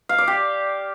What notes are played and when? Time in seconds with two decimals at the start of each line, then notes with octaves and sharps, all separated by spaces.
0.09 F5
0.18 D5
0.27 G4